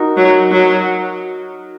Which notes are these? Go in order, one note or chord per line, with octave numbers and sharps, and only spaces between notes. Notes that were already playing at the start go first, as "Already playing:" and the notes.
Already playing: D#4 F#4 A#4
F#3
F#3